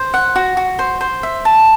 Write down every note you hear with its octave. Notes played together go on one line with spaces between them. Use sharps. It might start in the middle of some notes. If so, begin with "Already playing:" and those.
Already playing: C5
F#5
F#4
F#4
C5
C5
E5
A5